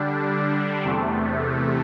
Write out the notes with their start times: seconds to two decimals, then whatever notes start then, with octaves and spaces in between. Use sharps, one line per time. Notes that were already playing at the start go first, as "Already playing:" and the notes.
Already playing: D3 G3 D4
0.83 E2 C3 A3